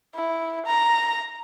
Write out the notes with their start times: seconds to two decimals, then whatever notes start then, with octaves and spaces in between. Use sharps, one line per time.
0.15 E4
0.66 A#5